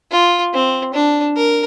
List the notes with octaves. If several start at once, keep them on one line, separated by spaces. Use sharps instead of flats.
F4
C4
D4
A#4